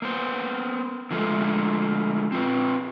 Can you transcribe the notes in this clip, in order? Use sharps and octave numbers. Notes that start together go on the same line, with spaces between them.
A#3 B3 C5
D3 F3 G#3 A3
C4 F4 B4